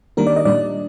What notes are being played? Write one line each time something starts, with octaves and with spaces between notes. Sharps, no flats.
D#3 G3 A#3 D4 A#4
D5
D#5
A#2 G3 D4 D5